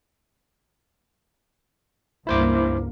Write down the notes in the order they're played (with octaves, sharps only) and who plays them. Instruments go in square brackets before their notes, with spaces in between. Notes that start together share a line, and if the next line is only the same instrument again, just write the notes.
[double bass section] C#2 G2 A#3 [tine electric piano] E4 C5 D6